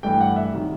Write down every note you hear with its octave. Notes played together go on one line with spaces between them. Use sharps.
G2 E3 A3 G5
F#5
E5
C3 D#3 F#3